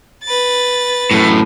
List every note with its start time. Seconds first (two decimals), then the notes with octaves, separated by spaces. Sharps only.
0.24 B4 A6
1.11 F#2 A2